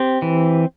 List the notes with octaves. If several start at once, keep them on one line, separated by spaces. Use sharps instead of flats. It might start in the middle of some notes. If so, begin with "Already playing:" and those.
Already playing: C4 G4
E3